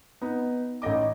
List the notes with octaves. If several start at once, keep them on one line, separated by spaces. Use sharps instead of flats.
B3 D#4
A1 D#4 D#5 D6